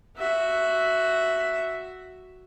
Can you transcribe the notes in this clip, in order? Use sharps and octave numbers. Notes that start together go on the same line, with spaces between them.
F#4 E5